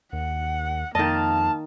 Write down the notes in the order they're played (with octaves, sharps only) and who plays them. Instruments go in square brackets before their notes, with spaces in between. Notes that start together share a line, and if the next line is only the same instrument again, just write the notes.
[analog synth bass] D#2 [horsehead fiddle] F#5
[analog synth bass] F2 [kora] D#3 D#5 [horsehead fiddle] A#3 F5 [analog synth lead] A5